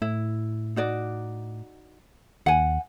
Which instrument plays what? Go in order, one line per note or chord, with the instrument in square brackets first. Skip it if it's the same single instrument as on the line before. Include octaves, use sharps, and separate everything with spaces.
[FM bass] A2 [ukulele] E4
[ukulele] D#4 F#4 D5
[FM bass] D#2 [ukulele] F#5 G#5